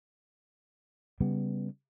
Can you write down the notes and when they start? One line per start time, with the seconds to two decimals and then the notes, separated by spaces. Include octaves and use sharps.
1.20 C#3 G3 B3